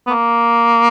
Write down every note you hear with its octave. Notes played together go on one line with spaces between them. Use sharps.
B3
A#3